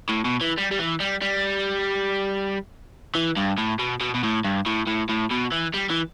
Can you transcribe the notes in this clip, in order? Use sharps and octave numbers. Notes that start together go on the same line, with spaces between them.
A2
B2
E3
G3
G3
E3
G3
G3
E3
G2
A2
B2
B2
B2
A2
G2
A2
A2
A2
B2
E3
G3
E3